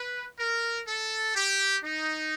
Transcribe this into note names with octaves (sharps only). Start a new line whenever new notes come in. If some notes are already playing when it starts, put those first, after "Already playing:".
Already playing: B4
A#4
A4
G4
D#4